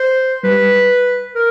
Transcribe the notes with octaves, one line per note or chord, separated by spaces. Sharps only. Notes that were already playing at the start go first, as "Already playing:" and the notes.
Already playing: C5
G3 B4
A#4